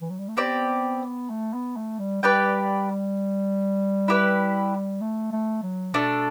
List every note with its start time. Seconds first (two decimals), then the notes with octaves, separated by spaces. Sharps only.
0.01 E3
0.10 F#3
0.19 G3
0.28 A3
0.37 B3 C4 G4 D5
1.30 A3
1.54 B3
1.76 A3
1.99 G3
2.23 G3 G4 B4 D5 G5
4.08 E4 G4 B4
5.01 A3
5.32 A3
5.63 F#3
5.94 B2 A3 D4 A4